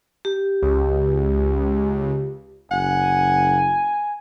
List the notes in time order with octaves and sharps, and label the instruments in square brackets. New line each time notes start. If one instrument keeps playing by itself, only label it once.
[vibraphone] G4
[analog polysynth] C#2
[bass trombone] F#1 [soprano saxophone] F#5 [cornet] G#5